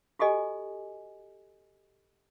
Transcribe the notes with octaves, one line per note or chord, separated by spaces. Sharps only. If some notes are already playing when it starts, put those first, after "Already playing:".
F#4 G4 A4 D#5 G#5